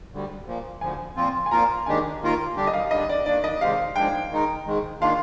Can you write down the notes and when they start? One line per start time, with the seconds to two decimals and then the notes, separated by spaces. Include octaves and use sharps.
0.11 D2 D3 G3
0.46 A#2 F3 A#3
0.81 D2 D3 F3 G#5
1.16 A#2 F3 C4 F4
1.46 G#5
1.51 A#2 F3 A#3 F4 A#4 A#5
1.86 D#2 D#3 G#3 D4 G4 G#5
2.21 D#2 D#3 A#3 F4 A#4
2.56 D3 G3 D4 G4
2.67 D#5
2.73 F5
2.91 D3 G3 D4 D#5
3.09 D5
3.26 D#3 A#3 D4 D5
3.44 D#5
3.61 C3 D#3 G#3 C4 G4 F5
3.96 G#2 F3 G#3 D4 G#4 G5
4.31 D#3 G#3 D#4 A#4
4.66 G#2 D#3 G#3
5.01 D#3 A#3 D4 F4 F5